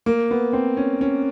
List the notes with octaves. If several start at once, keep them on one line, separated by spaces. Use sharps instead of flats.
A#3
B3
C4
C#4
C#4